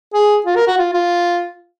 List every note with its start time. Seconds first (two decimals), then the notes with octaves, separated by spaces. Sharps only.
0.14 G#4
0.46 F4
0.56 A#4
0.67 F#4
0.78 F4
0.94 F4